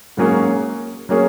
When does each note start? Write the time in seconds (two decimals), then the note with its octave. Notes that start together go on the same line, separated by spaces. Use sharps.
0.17 G#2 F#3 A#3 C#4 G#4
1.09 F#3 A#3 C#4 G#4